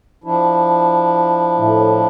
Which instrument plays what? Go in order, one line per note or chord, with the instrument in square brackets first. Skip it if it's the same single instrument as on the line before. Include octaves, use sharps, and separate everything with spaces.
[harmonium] F3 D4 E4
[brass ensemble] A2